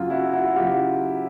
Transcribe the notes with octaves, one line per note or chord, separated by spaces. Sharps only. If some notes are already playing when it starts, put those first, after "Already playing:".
Already playing: F#2 C#3 F#3 F4
E4 F#4
E4 F#4
F#2 C#3 F#3 F4 G4